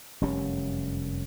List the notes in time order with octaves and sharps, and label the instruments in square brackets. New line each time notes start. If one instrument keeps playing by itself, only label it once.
[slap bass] F1 F#2 G3 C#4